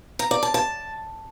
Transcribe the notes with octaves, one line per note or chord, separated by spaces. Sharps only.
A#5
D5
A5
A5